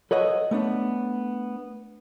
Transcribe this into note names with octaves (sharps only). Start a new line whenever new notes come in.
A4 B4 C#5 D#5 F#5
A3 B3 D4